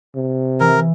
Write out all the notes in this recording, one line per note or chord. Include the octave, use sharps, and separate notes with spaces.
C3
E3 A#4